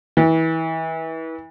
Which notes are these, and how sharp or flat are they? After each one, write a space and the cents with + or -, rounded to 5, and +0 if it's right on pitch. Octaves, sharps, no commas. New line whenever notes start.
E3 -30